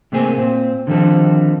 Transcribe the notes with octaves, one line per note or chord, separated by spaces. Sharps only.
C3 A3 A#3 C4 G#4
A#2 C4
D3 D#3 F3 G3 C4 A4